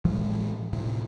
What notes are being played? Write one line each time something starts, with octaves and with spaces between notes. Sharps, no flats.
A2 E3 F3 G#3
A2 C3